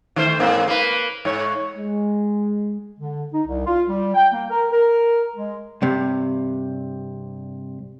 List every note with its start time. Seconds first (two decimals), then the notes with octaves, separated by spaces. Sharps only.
0.16 D#3 A3 C5
0.39 G#2 A#3 C4
0.67 A#3 B4
1.25 G#2 C#5
1.76 G#3
2.99 D3
3.34 D#4
3.47 C2
3.66 F4
3.88 G3
4.15 G5
4.33 A#3
4.50 A#4
4.72 A#4
5.35 G#3
5.82 G2 C3